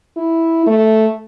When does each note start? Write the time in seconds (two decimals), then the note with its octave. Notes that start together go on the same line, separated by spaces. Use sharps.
0.17 E4
0.67 A3